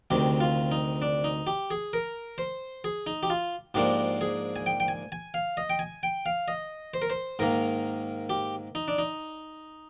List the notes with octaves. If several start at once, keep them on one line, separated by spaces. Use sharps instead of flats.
D2 C3 D#3 G4
F4
D#4
D4
D#4
G4
G#4
A#4
C5
G#4
D#4
G4
F4
G#2 F3 A#3 D4 G4
G#4
G#5
G5
G5
G#5
G#5
F5
D#5
G5
G#5
G5
F5
D#5
C5
A#4
C5
G#2 D#3 A#3 A#4
G4
D#4
D4
D#4